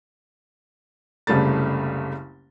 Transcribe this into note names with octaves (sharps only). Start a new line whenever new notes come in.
F#1 C2 C#3 G3 A3 A6